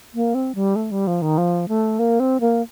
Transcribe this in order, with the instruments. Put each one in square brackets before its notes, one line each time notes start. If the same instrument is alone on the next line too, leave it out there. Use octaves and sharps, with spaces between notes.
[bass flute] A#3
C4
G3
A3
G3
F3
D#3
F3
A3
A#3
C4
A#3